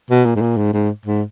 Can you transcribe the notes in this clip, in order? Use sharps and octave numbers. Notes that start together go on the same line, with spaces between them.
B2
A#2
G#2
A#2
G#2
G#2
G#2